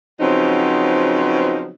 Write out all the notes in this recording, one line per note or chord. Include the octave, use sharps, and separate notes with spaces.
C#3 F3 F#3 B3 C4 D#4